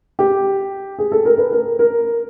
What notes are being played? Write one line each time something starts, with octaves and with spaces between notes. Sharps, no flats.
G4
G#4
A4
A#4
B4
A#4
A#4